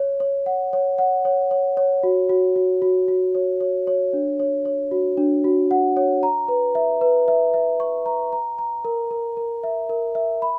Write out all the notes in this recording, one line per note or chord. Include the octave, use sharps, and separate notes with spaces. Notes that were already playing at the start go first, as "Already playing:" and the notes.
Already playing: C#5
C#5
F#5
C#5
F#5
C#5
C#5
C#5
F#4
F#4
F#4
F#4
F#4
C#5
C#5
C#5
D4
C#5
C#5
F#4
D4
F#4
F#5
C#5
A#5
B4
E5
B4
E5
E5
C#6
A#5
A#5
A#5
A#4
A#4
A#4
E5
A#4
E5
B5